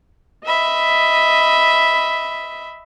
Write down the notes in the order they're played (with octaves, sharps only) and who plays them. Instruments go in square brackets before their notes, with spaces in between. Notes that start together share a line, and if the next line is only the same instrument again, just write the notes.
[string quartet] D#5 E5 B5